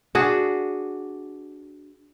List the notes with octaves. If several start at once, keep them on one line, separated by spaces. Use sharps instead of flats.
D4 F#4 G#4